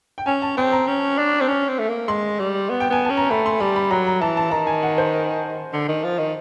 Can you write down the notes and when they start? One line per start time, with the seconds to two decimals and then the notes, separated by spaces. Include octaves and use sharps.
0.18 G5
0.26 C#4 G#5
0.42 A5
0.57 C4 G5
0.72 A#5
0.87 C#4
1.18 D4
1.41 C4
1.48 C#4
1.68 C4
1.79 A3
1.89 A#3
2.08 G#3 C6
2.39 G3
2.70 B3
2.80 G5
2.90 B3 G#5
3.05 C#4 A5
3.17 A#5
3.30 A3 B5
3.46 C6
3.60 G3 B5
3.76 B5
3.91 F#3 A#5
4.07 A#5
4.21 E3 A5
4.37 A5
4.51 D#3 A#5
4.67 G#5
4.83 F#5
4.98 C5
5.73 D3
5.88 D#3
6.04 F3
6.19 D#3